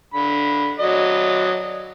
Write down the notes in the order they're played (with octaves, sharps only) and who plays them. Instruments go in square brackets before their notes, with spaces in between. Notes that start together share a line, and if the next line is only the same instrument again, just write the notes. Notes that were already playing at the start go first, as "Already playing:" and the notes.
[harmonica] D3 B5
F#3 D5 D#5